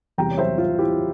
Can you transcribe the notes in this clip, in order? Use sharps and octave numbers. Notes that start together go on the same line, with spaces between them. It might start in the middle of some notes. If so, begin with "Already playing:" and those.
E2 C3 G3 G5 A#5
C#5
C5 E5
F4
E4 G4